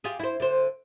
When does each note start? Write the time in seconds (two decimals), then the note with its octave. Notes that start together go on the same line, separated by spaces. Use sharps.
0.04 F4 G4 G#4
0.19 E4 C5
0.40 D3 C5